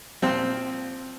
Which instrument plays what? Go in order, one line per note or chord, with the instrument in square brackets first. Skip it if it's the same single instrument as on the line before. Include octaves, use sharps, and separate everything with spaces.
[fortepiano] A#2 F3 C4